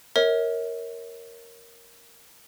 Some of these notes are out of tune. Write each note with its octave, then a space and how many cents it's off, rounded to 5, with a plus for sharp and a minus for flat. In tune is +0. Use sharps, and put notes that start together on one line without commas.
A#4 +0 C#5 -15 E5 -45